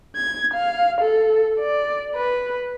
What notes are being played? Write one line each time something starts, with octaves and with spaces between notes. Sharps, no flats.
G#6
F5
A4
D5
B4